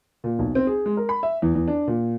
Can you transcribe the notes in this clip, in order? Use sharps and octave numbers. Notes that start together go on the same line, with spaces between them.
A#2
B1
C4
G#4
G#3
A#4
B5
E5
E2
E2
D4
A#2